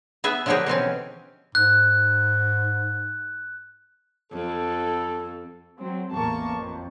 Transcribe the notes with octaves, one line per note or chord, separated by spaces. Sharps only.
B3 G#4 E5
D3 F3 F#3 A#3 G4 G#4
B2 E3 C4 C#4
G#2 F#6
F2 A4
F#3 C4
A1 E2 A#3 A5 C#6
F2